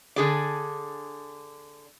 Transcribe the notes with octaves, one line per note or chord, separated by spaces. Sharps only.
D3 G#4 D5